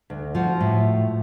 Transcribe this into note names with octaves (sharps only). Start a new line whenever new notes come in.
D2
F3 F#4
A2